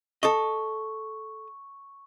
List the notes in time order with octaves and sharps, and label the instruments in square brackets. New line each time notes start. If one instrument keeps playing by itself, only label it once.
[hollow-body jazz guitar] A4 D#5 [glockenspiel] C#6